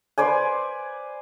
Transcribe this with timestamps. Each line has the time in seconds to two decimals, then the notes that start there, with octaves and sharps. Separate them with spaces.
0.18 B4 C5 D5 G#5